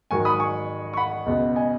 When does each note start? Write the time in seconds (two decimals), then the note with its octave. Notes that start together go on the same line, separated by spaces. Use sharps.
0.11 G#2 D#3 F#3 G#5 C#6
0.25 B5 D#6
0.39 G#5 C#6
0.93 C#6
0.97 F#5 B5
1.26 C#2 B2 G#3
1.56 D#5 G#5